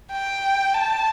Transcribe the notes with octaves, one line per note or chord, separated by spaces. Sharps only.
G5
A5